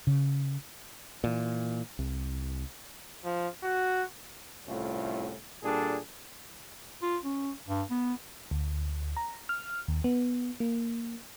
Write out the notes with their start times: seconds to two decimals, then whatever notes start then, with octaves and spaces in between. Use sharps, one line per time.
0.07 C#3
1.24 A#2 E3
1.99 C2
3.24 F3
3.63 F#4
4.67 C2 A2 A3 C#4 F4
5.63 A#2 G3 D4 G#4 A4
7.02 F4
7.24 C#4
7.68 G2
7.90 B3
8.51 D2
9.17 A#5
9.49 F6
9.88 D#2
10.04 B3
10.60 A#3